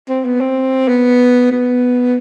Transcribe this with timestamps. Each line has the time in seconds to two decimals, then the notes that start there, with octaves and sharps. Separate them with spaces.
0.09 C4
0.25 B3
0.40 C4
0.88 B3
1.51 B3